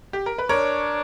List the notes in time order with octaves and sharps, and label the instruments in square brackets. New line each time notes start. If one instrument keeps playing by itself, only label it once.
[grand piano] G4
A#4
B4
[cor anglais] D4 [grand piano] A#4 C#5